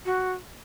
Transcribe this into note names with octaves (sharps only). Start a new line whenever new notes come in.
F#4